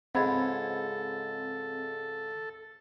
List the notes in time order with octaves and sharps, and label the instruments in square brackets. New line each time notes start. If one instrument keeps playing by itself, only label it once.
[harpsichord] C#2 G#2 [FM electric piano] C4 [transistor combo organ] A4 [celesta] F#5 B5 G#6